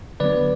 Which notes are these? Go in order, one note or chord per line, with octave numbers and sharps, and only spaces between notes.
D3 F#3 B3 B4 D5